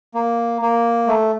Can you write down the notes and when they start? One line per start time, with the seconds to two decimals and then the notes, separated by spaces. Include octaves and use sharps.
0.14 A#3
0.62 A#3
1.07 A3